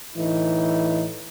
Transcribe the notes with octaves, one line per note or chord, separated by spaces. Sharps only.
A2 E3 D#4 E4